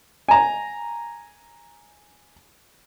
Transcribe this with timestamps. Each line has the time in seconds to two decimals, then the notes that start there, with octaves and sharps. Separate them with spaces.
0.29 G#5 A#5